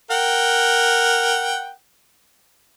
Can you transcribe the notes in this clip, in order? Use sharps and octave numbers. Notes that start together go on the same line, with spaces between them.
A#4 F#5 G5